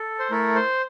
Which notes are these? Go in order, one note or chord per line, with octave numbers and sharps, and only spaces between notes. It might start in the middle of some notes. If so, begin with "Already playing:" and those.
Already playing: A4
C5
A3 E4 A4 A#4
C5